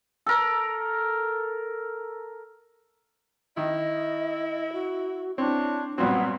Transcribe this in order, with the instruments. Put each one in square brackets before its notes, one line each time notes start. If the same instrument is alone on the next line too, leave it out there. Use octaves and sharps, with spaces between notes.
[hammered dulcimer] A4 A#4
[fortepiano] D#3 [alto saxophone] E4 [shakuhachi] D#5
[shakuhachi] F#4
[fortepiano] C4 [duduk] D4 [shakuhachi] E4 [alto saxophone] C#5
[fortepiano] G2 A#2 C4 [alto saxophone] F#3 [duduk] B3 [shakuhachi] F#4